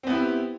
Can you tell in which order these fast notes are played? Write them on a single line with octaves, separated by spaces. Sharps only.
C4 B3 E4 G4